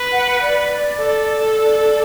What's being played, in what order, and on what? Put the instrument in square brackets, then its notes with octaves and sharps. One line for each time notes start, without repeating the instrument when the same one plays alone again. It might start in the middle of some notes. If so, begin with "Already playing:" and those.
Already playing: [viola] B4
[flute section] F#5
D5
[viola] A4
[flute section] D5